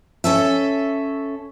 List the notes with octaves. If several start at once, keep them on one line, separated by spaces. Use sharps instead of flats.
C#4 A4 E5